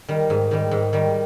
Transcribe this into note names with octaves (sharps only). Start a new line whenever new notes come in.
D#3 G3
G#2
D#3 G3
G#2
D#3 G3